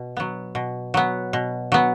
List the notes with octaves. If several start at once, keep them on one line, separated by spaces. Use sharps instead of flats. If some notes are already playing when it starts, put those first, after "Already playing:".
Already playing: B2
F#3 B3
B2
F#3 B3
B2
F#3 B3